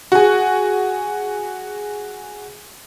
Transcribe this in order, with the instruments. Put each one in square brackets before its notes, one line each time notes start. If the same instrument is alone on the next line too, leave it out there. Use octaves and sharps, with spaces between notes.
[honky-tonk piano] F#4 G#4